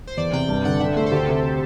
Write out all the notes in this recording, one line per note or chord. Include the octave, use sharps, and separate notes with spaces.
C5
E2 D5
C3 G5
G2 G5
D3 F#5
D3 E5
A3 C5
A4
D2 G4
C3